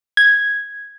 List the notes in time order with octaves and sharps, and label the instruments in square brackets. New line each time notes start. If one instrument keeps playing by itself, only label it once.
[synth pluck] G#6